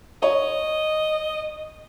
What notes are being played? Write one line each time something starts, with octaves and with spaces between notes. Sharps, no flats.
C#5 D#5